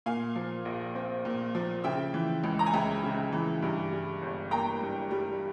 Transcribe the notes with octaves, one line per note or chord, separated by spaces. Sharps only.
A#2 F5 G#5
F3
A#1
C4
A#2
F3
C#3 E5 G5
E3
C#2
A#5
G#5
C#2 E5 G5
C#3
E3
G2
G3
G1
A#3 G5 A#5
G2
G3